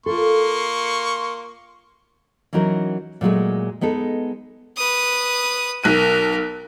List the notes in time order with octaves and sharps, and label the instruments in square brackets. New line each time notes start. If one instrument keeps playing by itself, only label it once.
[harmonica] A#3 C6 C#6 [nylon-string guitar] F4 A4
[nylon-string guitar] E3 F#3 C#4 D#4 F#4 A#4
A#2 F#3 G#3 A3
G#3 B3 D#4 A4
[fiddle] B4 D#6
[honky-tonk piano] B1 F#6 D#7 [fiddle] A#4